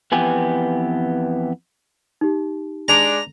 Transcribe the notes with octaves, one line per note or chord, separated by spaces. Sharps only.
F2 E3 B3 G4 G#5
D#4 G4
G#3 D4 A#5